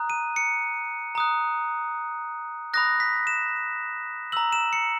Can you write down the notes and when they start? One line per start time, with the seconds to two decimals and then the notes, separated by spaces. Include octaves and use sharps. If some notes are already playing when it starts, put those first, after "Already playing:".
Already playing: A#5 D#6 F#6
0.10 D#7
0.36 C#7
1.15 A#5 D#6 F#6
2.74 B5 D#6 F#6 A#6
3.00 B6
3.27 E7
4.32 A#5 E6 F#7
4.52 E7
4.73 C#7